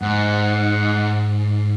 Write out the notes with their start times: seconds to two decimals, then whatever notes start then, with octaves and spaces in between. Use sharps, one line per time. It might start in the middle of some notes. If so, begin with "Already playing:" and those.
0.02 G#2 F#5